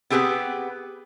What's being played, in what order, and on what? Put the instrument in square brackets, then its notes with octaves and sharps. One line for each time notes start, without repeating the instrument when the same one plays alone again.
[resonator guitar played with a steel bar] B3 C4 G4 G#4 B4